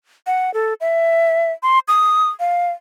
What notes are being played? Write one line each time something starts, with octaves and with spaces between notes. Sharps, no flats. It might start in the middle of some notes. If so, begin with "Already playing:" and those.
F#5
A4
E5
C6
D#6
F5